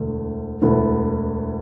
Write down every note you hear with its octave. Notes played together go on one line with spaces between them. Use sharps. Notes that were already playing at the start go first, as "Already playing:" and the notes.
Already playing: E1 D2 D3 A3
E1 D2 D3 B3 E4